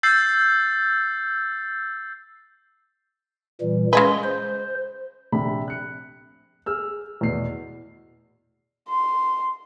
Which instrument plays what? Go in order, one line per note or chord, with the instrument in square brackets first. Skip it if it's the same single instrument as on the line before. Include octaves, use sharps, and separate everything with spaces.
[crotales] E6 G6 A6 C7
[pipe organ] A#2 E3 G3
[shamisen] C#3 G#4 B4 [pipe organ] G#3 C6
[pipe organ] C5
[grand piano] A#1 C3 B5
F#6 C#7
G#4 E6 F6
E2 B2 C7
[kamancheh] C6